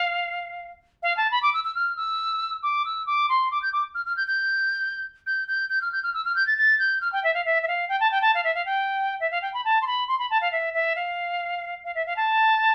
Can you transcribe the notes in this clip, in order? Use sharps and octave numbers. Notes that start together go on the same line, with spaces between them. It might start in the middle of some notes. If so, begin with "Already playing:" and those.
Already playing: F5
F5
A5
B5
D6
E6
E6
F6
E6
D6
E6
D6
C6
D6
G6
D6
F6
F6
G6
G6
G6
G6
G6
F6
G6
F6
E6
F6
G6
A6
A6
G6
F6
G5
E5
F5
E5
E5
F5
G5
A5
G5
A5
F5
E5
F5
G5
E5
F5
G5
B5
A5
C6
B5
C6
B5
A5
F5
E5
E5
F5
F5
E5
F5
A5